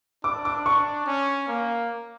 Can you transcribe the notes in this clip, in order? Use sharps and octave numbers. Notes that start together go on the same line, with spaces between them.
D4 D6
D6
C#6
C#4
A#3